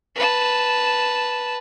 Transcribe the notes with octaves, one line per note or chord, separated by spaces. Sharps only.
B4 A5